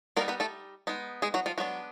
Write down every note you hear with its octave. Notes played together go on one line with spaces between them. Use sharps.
G3 A#3 B3 D#4 A#4
B3 B4
A3 A4
G#3 B3 D#4
G#3 G#4
F#3 F#4
F3 F4
F#3 G#3 B3 D4 F#4